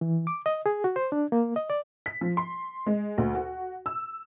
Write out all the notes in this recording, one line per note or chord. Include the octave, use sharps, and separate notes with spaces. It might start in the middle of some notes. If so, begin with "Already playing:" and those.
E3
D6
D#5
G#4
F#4
C5
D4
A#3
D#5
D5
B6
F3
C6
G#3
D2
F#4
E6